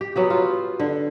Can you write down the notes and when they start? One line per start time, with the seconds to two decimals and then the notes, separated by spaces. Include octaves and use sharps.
0.01 G4
0.16 F#3 B3 G4
0.30 F4
0.80 D3